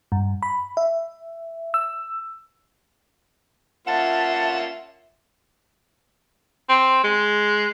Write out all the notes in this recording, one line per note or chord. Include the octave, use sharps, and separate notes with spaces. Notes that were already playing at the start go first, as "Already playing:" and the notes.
G2
B5
E5
E6
A#3 C#4 F4 E5 F#5 A5 A6
C4
G#3